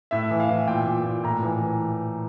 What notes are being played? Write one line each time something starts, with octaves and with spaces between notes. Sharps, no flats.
A2 E5
E3
F5
E3
A#2 G5
A#2
A#2
A2 A#5
E3
E3